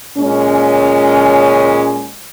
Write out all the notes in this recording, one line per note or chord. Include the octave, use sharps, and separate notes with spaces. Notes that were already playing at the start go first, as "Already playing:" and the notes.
A#2 G#3 C#4